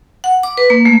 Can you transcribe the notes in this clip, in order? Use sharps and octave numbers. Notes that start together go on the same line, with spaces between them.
F#5
D6
B4
A#3
A3